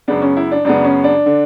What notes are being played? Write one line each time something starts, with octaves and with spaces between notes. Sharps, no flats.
F#2 C#3 G#3 B3 D4
C#4
E4
D4
F#2 C#3 G#3 B3 D4
C#4
D4
D3